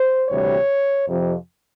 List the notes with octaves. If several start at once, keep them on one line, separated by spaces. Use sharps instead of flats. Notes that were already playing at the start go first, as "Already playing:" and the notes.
Already playing: C5
D2 C3 E3 G3 C#5
F2 C3 F3